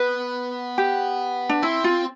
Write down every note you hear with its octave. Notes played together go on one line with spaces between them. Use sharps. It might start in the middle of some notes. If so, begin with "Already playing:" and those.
Already playing: B3 B4
G4
D4
C4 E4
F4